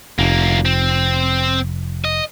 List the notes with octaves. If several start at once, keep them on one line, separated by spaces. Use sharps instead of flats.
F1 D2 A#3
C4
D#5